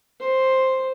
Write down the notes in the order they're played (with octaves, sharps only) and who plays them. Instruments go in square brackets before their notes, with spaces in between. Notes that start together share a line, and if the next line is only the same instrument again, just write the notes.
[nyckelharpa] C5